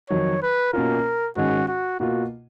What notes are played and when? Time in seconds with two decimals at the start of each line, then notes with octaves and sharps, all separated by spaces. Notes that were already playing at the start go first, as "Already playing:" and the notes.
0.10 F2 D#3 F#3 C#5
0.42 B4
0.73 B2 A#3 C#4 F4 A#4
1.36 G#2 D#3 G#3 C#4 F#4
1.68 F#4
2.00 B2 A#3 F4 F#4